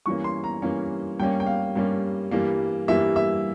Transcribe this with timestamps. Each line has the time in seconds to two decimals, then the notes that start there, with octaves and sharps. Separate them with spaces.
0.06 G2 E3 A#3 C#4 C#6
0.24 C6
0.44 A#5
0.62 G2 E3 A#3 C#4
1.19 G2 G3 A#3 C#4 G5
1.40 G5
1.47 F5
1.75 G2 G3 A#3 C#4
2.31 G2 E3 G3 A#3
2.88 G2 E3 G3 A#3 E5
3.16 E5